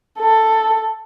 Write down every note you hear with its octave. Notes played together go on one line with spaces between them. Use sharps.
A4